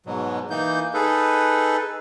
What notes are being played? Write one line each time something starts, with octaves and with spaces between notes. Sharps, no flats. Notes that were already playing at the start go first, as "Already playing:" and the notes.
G#2 B2 F#3
E3 A#3 D#4 G6
D#4 G#4 A4 B4